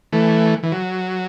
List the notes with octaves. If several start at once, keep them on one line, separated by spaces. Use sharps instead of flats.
E3 A3
E3
F#3